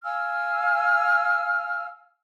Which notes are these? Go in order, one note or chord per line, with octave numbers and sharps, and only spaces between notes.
F5 G#5 E6 F6